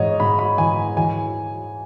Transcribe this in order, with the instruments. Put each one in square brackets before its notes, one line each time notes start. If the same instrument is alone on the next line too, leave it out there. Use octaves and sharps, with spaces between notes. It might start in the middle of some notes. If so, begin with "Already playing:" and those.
Already playing: [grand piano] G#2 E3 C#5 D#5
G#2 B5
B5
E3 G#5
E3 G#5